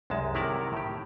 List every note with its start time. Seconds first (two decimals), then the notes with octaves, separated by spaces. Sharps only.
0.10 C2 F#2 G#3 A5
0.35 C3 D#3 E4 A#4 F#5 A5
0.73 A2 G4